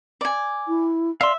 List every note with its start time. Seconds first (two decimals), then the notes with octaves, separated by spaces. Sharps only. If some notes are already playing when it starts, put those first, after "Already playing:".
0.21 D5 G#5
0.68 E4
1.21 D5 E5 F5 C6